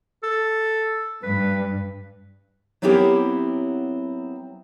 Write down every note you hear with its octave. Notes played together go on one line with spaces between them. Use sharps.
A4
G2 B4
F#3 B3 C4 E4 G4 A#4